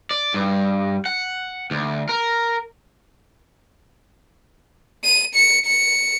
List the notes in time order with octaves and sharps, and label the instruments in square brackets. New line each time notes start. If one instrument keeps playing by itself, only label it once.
[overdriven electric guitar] D5
G2
F#5
D2
A#4
[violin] D#7
C#7
C#7